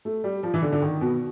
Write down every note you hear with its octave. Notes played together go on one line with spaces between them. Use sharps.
A3
G3
F3
E3
D3
D3
D#3
B2